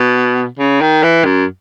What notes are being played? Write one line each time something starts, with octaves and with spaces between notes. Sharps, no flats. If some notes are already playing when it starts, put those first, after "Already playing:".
Already playing: B2
C#3
D#3
E3
F#2